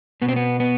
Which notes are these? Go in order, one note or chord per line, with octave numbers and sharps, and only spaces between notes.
B2 B3
C4
B3
B3